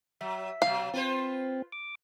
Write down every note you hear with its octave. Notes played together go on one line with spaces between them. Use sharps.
F#3 E5
B2 F#3 F5
C4 F4 B4 C5
D6